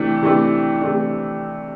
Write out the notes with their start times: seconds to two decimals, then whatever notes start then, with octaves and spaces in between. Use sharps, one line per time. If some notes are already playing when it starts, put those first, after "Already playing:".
Already playing: C3 E3 A3 D4
0.22 C3 E3 A3 D4
0.82 C3 E3 A3 D4